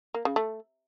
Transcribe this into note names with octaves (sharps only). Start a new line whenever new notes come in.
A#3
C#3
A3